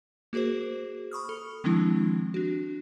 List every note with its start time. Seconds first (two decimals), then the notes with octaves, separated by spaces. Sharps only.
0.33 A#3 F#4 G#4 A#4 C5
1.11 B5 C#6 D#6 F6
1.29 A4
1.64 D#3 F3 G#3 C4 D4 E4
2.34 D4 F#4